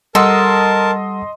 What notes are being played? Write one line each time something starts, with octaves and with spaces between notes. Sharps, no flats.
G3 A4 A#4 D#5 F#5 A5 C6 D#6